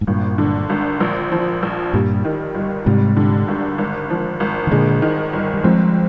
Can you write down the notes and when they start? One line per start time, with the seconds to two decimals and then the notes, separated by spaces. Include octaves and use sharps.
0.01 G#2
0.07 G#1 G2 A#2
0.38 D3
0.70 G#1
1.00 A#1
1.32 F3
1.63 A#1
1.93 G2 A#2 G3
2.25 D#3
2.55 G1
2.86 G#2 C3 G3
3.17 D3
3.48 G#1
3.78 G#1
4.10 F3
4.40 G#1
4.67 D#3
4.71 A#2 D3 G#3
5.02 D#3
5.33 G1
5.54 G3
5.64 F3 G#3 C4